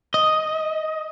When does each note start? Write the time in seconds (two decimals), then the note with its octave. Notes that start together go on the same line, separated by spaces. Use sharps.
0.14 D#5